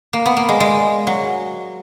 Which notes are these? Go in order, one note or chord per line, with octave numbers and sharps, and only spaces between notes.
A#3
B3
A#3
G#3
G#3
F#3